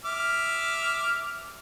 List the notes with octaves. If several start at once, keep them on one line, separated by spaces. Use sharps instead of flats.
E5 D6 F6